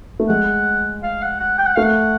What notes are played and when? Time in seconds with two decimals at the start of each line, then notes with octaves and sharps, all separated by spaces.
0.20 A3
0.29 G#3 F#5
1.03 F5
1.22 F#5
1.40 F#5
1.58 G5
1.66 F#5
1.76 A3 F5
1.83 F#5